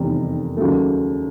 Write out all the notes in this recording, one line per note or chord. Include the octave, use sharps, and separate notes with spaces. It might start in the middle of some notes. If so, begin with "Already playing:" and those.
Already playing: F1 E2 C3 D#3 G3
D#2 C#3 F#3 A3